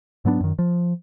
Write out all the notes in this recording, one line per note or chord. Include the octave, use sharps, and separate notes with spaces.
G#2 F#3 B3 D4
F#2 D#3
F3